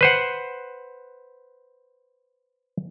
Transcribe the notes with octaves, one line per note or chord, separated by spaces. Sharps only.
B4 C5 F#5